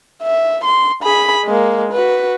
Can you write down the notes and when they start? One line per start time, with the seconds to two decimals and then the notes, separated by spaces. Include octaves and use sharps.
0.22 E5
0.64 C6
1.03 G#4 B5
1.45 G#3 A#3
1.93 F#4 B4